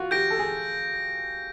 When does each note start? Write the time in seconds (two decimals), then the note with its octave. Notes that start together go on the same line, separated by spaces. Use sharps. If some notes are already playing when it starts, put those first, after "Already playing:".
Already playing: F4 F#4
0.11 G4 G6 A#6 D7
0.30 A4
0.39 G#4